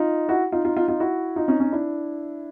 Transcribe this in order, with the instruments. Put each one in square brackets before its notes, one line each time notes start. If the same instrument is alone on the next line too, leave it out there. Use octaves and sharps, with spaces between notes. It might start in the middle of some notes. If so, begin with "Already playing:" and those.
Already playing: [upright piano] D#4 F4
E4 F#4
D#4 F4
D#4 F4
D#4 F4
D#4 F4
E4 F#4
D#4 F4
C#4 D#4
C#4 D#4
D4 E4